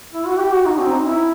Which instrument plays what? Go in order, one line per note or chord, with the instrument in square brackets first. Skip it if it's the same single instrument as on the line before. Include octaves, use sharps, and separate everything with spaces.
[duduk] E4
F#4
G4
F#4
D#4
C4
D#4
E4